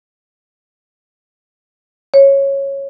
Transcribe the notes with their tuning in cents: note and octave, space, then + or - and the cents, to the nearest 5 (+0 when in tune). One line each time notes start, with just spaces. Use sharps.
C#5 -10